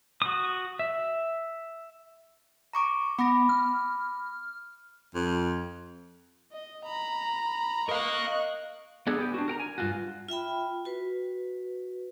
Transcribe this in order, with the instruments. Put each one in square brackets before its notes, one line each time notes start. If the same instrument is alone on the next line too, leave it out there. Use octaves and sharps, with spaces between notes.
[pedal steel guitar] F#4 D#6
E5
[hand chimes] A#5 C#6 D6
[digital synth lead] B3 [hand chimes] B5 D6 A#6
[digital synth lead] F6
[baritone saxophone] F2
[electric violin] D#5
A#5 B5
[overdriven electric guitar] A#4 F5 [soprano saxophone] D#5 [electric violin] C#6 F#6
[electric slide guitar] B3 D4 G#4 A4
B3 G4
D4 F#4
A#4 G5 A#5
G#5
G2 F4 F#4
[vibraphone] F4 E5 G5 B5
F#4 B4